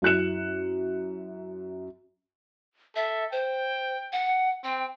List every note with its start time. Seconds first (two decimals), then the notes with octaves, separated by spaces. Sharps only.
0.02 F#2 E4 F#6 C#7 E7
2.96 A4 E5
3.32 C5 G5
4.12 F#5
4.64 C4 G5